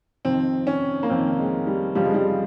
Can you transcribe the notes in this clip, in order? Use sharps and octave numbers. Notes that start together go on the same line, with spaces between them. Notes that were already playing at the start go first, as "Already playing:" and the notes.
F2 D#3 C4
C#4
A#3
F2 D#3 C4
G#3
G3
F2 C#3 F3 G3
G#3
G3